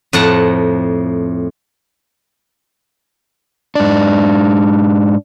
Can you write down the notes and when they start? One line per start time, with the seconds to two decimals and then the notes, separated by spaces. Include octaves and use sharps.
0.13 F2 A2 F#5 A5 A#5
3.75 G#2 D4